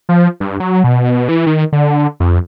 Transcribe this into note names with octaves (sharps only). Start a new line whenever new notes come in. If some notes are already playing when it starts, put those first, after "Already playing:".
F3
G2
F#3
B2
E3
D#3
D3
F2